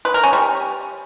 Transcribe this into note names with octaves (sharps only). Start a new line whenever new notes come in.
B4
A#4
C#4
G3